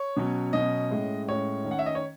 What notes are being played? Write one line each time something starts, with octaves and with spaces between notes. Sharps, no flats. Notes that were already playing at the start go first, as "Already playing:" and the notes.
Already playing: C#5
B2 F#3 C#4
B2 F#3 C#4 D#5
A2 G#3 C#4
A2 G#3 C#4 C#5
D#3 A3 C#4
F#5
E5
D#5
C#5